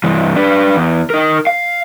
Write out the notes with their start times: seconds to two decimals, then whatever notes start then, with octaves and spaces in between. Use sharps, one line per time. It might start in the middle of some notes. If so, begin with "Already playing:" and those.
0.04 G2 E3
0.36 D4 B4
0.76 E2
1.10 D#4 A#4
1.47 F5